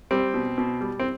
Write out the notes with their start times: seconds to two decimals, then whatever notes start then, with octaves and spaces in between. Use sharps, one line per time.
0.11 G3 C4
0.34 B2
0.58 B2
0.81 G3
1.00 C4